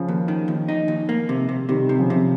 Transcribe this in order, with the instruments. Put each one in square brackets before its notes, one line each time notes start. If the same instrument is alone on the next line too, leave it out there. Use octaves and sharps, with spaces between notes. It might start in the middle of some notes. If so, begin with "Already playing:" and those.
Already playing: [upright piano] C#3 F3
[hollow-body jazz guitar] D#2
D#3
D#2
D#4
D#2
A#3
C3
C3
[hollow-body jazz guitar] C3 [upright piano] D#3 G3
[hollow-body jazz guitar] C3
[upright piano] C#3 F3
[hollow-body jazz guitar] C3